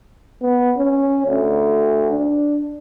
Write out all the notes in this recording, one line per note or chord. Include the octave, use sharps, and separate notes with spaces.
B3
C#4
D2
D4